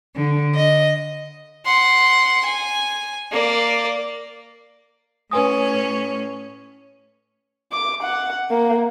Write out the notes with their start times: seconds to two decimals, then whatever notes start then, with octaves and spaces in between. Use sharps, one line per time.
0.16 D3
0.56 D#5
1.65 F#5 C6
2.45 G#5
3.32 A#3 D5
5.31 A2 C#4 B4 G#5 D#6
7.72 D6
8.03 F#5
8.50 A#3